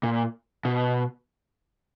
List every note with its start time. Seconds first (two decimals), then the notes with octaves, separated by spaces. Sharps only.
0.03 A#2
0.65 B2